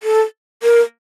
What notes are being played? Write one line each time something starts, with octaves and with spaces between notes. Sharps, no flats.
A4
A#4